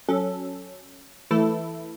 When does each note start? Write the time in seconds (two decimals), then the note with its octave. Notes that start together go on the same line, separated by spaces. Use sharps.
0.09 F#3 C#4 A4
1.31 E3 A3 E4 A4